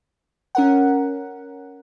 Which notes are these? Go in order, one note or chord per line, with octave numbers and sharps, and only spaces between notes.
C#4 A#4 F#5